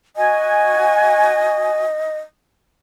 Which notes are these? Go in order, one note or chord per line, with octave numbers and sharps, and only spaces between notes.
F#4 D#5 G#5